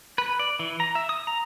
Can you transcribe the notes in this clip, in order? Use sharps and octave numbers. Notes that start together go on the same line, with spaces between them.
B4
D5
E3
A#5
E5
D#6
A#5